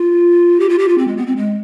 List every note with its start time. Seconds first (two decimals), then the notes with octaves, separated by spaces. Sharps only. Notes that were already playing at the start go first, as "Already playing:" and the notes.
Already playing: F4
0.60 G4
0.69 F4
0.79 G4
0.88 F4
0.98 C4
1.08 G#3
1.17 B3
1.27 C4
1.37 G#3